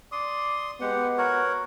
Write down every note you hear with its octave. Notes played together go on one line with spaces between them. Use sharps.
D5 C6 D#6
G#3 B3 G4 F#5
F#4 A#4 C#5